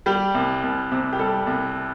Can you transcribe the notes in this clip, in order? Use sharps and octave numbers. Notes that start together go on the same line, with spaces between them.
G3 G4
C2
C2
C3
G4
G3 A4
C2